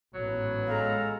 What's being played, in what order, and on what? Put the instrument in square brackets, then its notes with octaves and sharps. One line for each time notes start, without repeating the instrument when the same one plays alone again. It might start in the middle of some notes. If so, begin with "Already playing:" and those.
[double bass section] A1 G#2 B3 [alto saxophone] F#3
[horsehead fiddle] G#3 [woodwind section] A4 F5 A#5